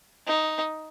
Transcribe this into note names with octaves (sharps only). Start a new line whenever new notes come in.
D#4